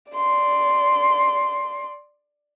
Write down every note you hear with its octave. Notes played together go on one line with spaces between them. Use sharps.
D5 C6